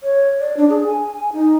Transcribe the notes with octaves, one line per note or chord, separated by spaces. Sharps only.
C#5
D5
D4
G#4
G#5
D#4